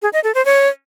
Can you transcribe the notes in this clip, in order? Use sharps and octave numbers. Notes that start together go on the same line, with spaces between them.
G#4
D#5
A4
C5
C#5